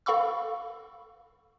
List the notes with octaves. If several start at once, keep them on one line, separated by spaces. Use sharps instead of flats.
A4 F5 B5 C#6 E6